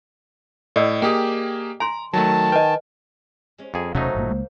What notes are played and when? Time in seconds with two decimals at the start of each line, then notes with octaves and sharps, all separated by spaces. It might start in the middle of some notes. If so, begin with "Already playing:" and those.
0.76 A2 D5 D#5 E6
1.02 A#3 G4 G#4 G5 D#6
1.80 G#5 A#5 C6
2.13 D#3 F#3 A3 A5
2.52 B4 D#5 G5 G#5
3.58 G#3 C#4
3.74 F2 A#3 G#4
3.95 E1 C3 F#3 A3 C#4 D#4 C5
4.15 G#1 G2 A#2
4.29 C#2 G#3 A#3